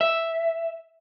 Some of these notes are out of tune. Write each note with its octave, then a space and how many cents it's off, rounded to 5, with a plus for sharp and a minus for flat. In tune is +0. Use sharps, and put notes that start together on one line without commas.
E5 +0